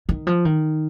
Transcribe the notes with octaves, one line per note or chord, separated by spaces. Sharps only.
D#3
F3
D#3